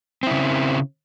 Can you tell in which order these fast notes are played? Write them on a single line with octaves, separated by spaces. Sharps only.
C4 E4 C#3